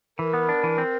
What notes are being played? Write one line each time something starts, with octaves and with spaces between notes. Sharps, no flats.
E3 A#4
B3
D4
E3
C4